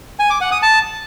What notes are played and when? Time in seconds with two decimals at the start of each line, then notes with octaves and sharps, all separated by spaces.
0.19 G#5
0.30 D6
0.41 F#5
0.52 D#6
0.62 A5